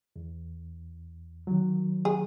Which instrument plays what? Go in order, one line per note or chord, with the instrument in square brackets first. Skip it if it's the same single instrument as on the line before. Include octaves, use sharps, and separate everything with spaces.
[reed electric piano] E2
D#3 F#3
[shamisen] G#4